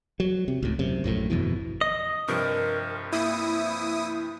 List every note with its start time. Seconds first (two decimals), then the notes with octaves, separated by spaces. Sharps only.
0.20 F#3
0.48 C3
0.62 C#2 A2
0.79 F#2 C3
1.04 A#1 F#2 A2
1.30 G1 F2 B2 E3
1.81 D#5
2.28 G2 C3 F3 A#4
3.13 A#3 E4 D#6